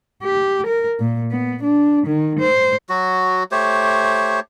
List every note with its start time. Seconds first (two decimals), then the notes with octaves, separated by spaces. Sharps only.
0.23 G4
0.67 A#4
1.00 A#2
1.32 B3
1.63 D4
2.07 D#3
2.40 C5
2.89 F#3 F#4
3.52 A3 G4 C5 C#5